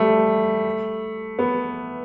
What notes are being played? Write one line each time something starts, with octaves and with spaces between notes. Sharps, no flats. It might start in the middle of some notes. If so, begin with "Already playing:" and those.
Already playing: G3 A3
B3